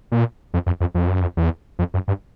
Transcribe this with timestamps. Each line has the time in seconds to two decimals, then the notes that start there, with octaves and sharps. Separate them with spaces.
0.12 A#2
0.54 F2
0.66 F2
0.81 F2
0.95 F2
1.08 F#2
1.22 F2
1.37 E2
1.79 F2
1.94 F#2
2.08 G2